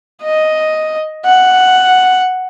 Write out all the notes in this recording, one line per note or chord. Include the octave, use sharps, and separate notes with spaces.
D#5
F#5